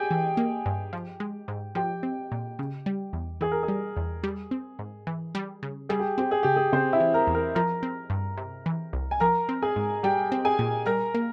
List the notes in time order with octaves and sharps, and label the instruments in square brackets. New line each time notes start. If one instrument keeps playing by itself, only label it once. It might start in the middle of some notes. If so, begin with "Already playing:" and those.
Already playing: [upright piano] G4 G#4 G5 G#5
[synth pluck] E3
A#3
G2
F3
G#3
G#2
[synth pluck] F3 [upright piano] G4 G5
[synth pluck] C4
A#2
C#3
G3
E2
[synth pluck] E3 [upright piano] G#4
[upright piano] A#4
G#4
[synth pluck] G3
E2
G3
C4
G#2
E3
G3
C#3
[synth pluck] G3 [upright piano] G#4
[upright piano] G4
[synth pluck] C4 [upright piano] G4
[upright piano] G#4
[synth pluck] C#3 [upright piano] G4
[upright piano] G#4
[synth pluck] C#3 [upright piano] C4 C5
[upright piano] E4 E5
[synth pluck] E3
[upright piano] A#4 A#5
[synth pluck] E2
[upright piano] A#4 A#5
[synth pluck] F3 [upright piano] A#4 A#5
[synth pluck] C4
G2
C3
E3
C2
[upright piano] G#5
[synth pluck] F3 [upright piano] A#4 A#5
[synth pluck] C4
[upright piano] G#4 G#5
[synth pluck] G#2
[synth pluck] G3 [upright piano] G4 G5
[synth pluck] C4
[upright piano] G#4 G#5
[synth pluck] A#2
[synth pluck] G3 [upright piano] A#4 A#5
[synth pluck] A#3